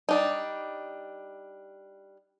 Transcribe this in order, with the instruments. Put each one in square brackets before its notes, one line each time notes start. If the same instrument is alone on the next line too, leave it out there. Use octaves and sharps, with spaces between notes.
[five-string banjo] G3 D4 D#4